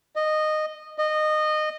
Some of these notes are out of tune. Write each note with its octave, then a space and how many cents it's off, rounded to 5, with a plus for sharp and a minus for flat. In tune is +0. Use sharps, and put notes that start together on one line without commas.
D#5 -15
D#5 -20